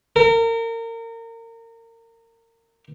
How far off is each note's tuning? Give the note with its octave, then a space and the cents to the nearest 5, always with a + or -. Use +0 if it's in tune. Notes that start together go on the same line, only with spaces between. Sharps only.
A#4 -30